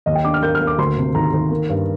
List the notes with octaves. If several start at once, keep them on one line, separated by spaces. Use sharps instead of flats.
D#2 D#5
G5
D4 D6
F6
A#3 G6
F6
A#3
D6
D2 C6
C3
D#3 A#5
D#3
A#3
G2